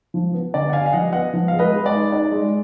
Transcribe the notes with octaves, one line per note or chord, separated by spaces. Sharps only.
F3
B3
D3 D5
F#5
B3 F5 G#5
F5
F3 D#5 F#5
B3 D#5 F#5
F3
G#3 F5
B4 D#5
G#3
D5
D#4
D#4 D5
G#3